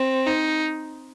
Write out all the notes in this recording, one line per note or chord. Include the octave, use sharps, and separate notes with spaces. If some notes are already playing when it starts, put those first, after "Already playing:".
Already playing: C4
D#4